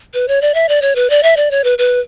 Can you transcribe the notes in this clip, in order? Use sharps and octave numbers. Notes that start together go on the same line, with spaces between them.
B4
C#5
D5
E5
D5
C#5
B4
D5
E5
D5
C#5
B4
B4